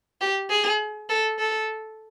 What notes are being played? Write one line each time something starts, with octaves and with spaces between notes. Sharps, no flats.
G4
G#4
A4
A4